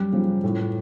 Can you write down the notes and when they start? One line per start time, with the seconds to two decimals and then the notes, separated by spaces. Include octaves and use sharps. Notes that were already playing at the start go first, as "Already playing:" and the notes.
Already playing: F#2 G3
0.12 C#3 F3
0.44 A2